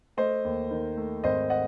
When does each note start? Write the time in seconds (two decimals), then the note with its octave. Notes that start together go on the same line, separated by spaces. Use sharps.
0.17 A3 C5 D#5
0.44 D#2
0.71 D#3
0.97 A3
1.24 G#1 C5 D#5
1.50 D#5 F#5